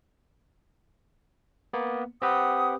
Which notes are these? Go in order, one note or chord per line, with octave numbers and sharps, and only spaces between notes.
A#3 B3
C4 G4 B4 F#5 D#6